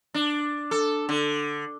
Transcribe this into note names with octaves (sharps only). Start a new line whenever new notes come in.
D4
A4
D3